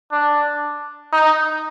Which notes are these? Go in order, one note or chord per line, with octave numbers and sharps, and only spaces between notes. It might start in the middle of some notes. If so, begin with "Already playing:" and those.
D4
D#4